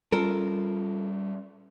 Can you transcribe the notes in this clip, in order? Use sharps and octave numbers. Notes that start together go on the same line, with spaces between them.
G3 C#4 F4 A4 A#4